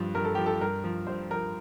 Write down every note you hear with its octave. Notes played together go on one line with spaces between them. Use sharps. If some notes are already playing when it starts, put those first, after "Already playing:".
Already playing: G2 F3
G2 A#4
A4
F3 G4
A4
G2 A#4
F3
G2 C5
F3 A#4